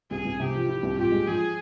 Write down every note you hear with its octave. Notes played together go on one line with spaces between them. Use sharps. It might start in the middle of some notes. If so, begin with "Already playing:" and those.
C2 G#4
C2
C3 G4
F3
E4
C2
A#2 G4
G#3
F3 G#4